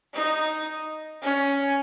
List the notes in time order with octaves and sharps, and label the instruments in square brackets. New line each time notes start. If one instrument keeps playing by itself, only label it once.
[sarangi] D#4
C#4